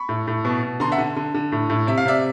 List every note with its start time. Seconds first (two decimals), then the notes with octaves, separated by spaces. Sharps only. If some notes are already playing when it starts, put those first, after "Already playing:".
Already playing: B5 C#6
0.09 A2
0.27 A2
0.45 B2
0.63 B2
0.80 D3 A#5 C6
0.92 E5 F#5
0.98 D3
1.16 D3
1.34 D3
1.52 A2
1.70 A2
1.87 C3 E5
1.98 F5
2.05 C3 D5 E5